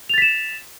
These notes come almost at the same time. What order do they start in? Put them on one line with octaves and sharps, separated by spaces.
F7 A6 B6 E7